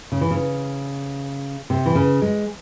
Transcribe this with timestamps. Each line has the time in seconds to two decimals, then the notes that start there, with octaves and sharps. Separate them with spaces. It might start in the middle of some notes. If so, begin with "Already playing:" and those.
0.12 C#3
0.21 E3
0.31 C#3
1.70 C3
1.86 E3
1.95 C#3
2.22 G#3